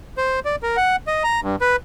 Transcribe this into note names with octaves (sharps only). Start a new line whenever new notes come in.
C5
D5
A#4
F#5
D#5
A#5
G2
B4